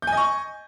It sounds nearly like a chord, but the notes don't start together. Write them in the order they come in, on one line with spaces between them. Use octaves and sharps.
G6 G#5 D#5 C#6